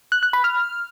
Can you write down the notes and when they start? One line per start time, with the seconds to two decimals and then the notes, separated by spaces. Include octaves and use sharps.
0.12 F#6
0.23 F#6
0.33 B5
0.44 F6